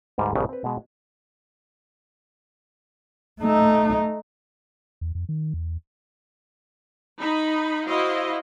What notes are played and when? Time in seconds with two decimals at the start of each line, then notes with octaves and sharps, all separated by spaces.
0.18 D2 G#2 G3 B4 A#5
0.35 A#1 G2 C#3 B3 G4
0.49 C4 B4
0.64 B2 G#3
3.40 A3 D#4
5.01 E2
5.15 F2
5.29 D#3
5.54 E2
7.19 D#4 B5
7.86 E4 F#4 C5 D#5 F5